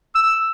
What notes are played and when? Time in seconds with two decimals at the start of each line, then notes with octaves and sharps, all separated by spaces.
0.15 E6